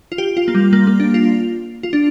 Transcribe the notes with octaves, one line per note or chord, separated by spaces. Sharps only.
F4
G4
F4
A#3
G3
A#3
A#3
D4
F4
F4
D4